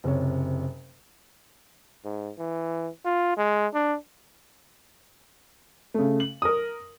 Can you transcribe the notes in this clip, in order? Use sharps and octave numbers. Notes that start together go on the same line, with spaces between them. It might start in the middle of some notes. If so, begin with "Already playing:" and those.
F#1 C3 C#5
G#2
E3
F4
G#3
D4
C#3 A3
F#7
A#4 D#6